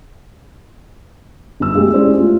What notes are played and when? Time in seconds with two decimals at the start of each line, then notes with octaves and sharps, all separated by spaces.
1.60 G1 E6
1.75 B2 G#3 A3 G4 G#4
1.93 C#4 E4 G#4 C5 D5
2.18 A3 F4